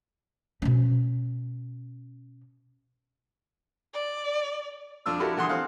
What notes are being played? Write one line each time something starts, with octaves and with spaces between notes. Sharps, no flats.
B2 C#4
D5
F2 D4 F4 E6
D4 E4 F#4 G4 A4 A#4
D3 E3 F#5 C6 D#6
C4 F5 F#5